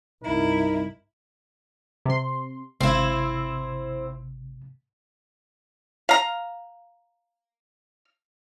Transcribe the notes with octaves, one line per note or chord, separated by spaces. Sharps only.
C2 G2 D#4 E4 A#4
C3 C6
G#1 C3 C4 E4
F5 A#5